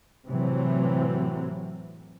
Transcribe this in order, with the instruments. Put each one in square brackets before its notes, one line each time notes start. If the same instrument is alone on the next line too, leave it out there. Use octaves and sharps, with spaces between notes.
[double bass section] A2 C3 E3 F#3 C4